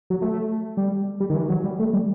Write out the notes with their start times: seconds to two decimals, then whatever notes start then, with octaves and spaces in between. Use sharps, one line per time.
0.10 F#3
0.22 A3
0.77 G3
1.20 G3
1.30 D#3
1.35 E3
1.49 F#3
1.64 G3
1.79 A3
1.94 G3